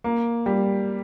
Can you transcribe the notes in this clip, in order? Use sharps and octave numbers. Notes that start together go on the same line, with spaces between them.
A#3
G3